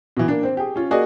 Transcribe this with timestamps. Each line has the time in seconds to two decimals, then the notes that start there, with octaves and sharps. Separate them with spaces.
0.17 B2 E3
0.28 A#3 D4
0.43 C4 C5
0.57 G4 G#4
0.76 C#4 F4
0.91 A#3 F#4 G#4 D5 D#5